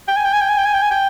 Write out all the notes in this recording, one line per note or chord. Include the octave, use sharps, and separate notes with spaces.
G5
G#5
G5
G#5
G5
G#5
G5
G#5
G5
G#5
G5